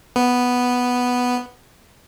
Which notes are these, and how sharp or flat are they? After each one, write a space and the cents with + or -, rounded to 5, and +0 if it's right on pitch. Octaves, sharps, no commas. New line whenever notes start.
B3 +0